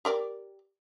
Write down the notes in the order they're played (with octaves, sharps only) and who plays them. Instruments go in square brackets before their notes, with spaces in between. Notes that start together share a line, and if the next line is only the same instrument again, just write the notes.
[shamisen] G4 A#4 D5